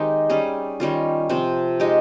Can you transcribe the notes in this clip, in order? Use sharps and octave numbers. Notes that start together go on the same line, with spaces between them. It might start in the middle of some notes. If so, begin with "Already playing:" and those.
Already playing: D#3 G#3 C4 D#4 G4
G3 C#4 G#4
D#3 G3 C#4 F4
C3 F3 C4
G#3 D#4 G4